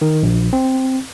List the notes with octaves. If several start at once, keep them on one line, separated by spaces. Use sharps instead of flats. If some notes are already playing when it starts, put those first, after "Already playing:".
D#3
A#1
C4